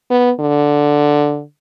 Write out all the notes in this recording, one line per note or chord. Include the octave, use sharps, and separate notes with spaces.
B3
D3